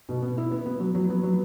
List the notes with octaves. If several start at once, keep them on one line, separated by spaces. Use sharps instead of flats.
B2
B3
E4
B3
B3
F#3
F#3
B3
F#3